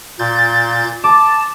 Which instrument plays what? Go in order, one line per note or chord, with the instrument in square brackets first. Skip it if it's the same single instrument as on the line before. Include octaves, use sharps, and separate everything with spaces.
[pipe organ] A#2 G6 A6
[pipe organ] A5 [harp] D6